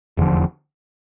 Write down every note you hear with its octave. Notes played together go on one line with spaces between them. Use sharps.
F1 E2 D3 F3